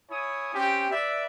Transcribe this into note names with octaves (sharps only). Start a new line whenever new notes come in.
E4 C#5 G#5 D#6
C4 C#4 G4
B4 D5 E5